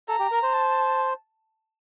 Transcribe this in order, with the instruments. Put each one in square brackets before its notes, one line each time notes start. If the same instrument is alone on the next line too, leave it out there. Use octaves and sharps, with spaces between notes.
[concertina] A4 [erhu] A#5
[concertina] G4
A#4
C5
[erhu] A5